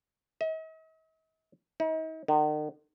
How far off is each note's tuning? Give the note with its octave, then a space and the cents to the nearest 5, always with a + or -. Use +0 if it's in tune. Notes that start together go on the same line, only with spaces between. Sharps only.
D#5 +45
D#4 +40
D#3 -45